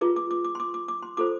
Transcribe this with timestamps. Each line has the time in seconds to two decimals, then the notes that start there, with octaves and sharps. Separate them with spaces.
0.01 F4 G#4 B4 D6
0.16 D6
0.31 D6
0.44 D6
0.55 C6
0.60 D6
0.74 D6
0.88 D6
1.02 C6
1.17 F4 A4 C5 D6